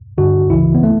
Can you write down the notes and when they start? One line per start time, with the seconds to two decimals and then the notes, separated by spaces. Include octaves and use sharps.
0.18 G2 D3 F#4
0.50 C#2 C#3 E3 E4
0.75 B3
0.83 A3